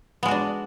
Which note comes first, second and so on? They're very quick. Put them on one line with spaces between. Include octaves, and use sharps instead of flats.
B3 G#3 F#4 D4